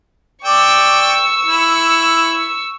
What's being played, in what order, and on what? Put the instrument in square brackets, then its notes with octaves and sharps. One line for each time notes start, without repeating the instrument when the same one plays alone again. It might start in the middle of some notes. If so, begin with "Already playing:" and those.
[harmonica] D5 G5 D6 [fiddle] C#6 E6
[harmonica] E4